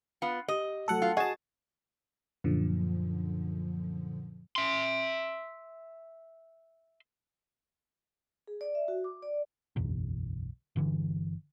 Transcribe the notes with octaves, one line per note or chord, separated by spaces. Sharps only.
B3 F4
G4 D#5
F#3 A3 A4 F#5
F4
F#4 G#4 D#5 A5 G#6
F#2 A#2 D3 F3
E5 C6
G#4
D5
E5
F#4
D6
D5
F#1 B1 E2
G1 D3 E3